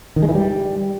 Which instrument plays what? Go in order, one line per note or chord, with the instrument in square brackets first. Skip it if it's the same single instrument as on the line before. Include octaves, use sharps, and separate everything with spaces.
[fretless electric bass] D#3
G#3
E3
G3